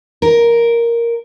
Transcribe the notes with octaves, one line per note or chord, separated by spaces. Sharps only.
A#4